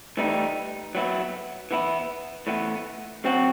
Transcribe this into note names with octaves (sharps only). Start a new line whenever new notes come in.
A2 E3 G3 D#4
F#3 B3 E4
E3 B3 E4
A2 E3 B3
F#3 C4 F#4